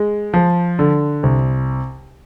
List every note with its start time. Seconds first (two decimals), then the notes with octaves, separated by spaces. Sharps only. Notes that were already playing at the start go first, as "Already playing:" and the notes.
Already playing: G#3
0.34 F3
0.79 D3
1.23 C2